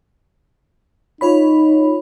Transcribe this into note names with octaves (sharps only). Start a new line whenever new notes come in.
D#4 F4 C#5 B5